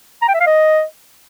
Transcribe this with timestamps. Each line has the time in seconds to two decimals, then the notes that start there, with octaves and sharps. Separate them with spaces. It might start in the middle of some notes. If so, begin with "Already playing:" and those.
0.22 A#5
0.28 G5
0.34 E5
0.40 F5
0.46 D#5